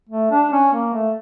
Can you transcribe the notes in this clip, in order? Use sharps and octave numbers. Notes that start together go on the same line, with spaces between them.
A3
D4
C#4
A#3
A3